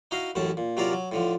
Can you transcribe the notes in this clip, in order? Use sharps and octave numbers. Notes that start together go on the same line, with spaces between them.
D#4 E4 F#4 D#5 F5
A1 F#2 A2 C#4 A5
A#2
C3 F#3 E4 F4 A#4 D5
F#3
A2 D3 F3